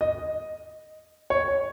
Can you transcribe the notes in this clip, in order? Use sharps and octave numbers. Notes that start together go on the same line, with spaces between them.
D#5
C#5